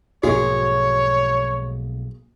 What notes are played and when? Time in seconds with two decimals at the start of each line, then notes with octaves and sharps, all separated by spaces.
0.23 B1 G#2 F3 A#3 F#4 G#4 C#5